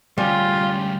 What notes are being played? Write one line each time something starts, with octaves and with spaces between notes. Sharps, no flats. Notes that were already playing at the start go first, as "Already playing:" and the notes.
D2 G3 C#4 F4 G4 G#4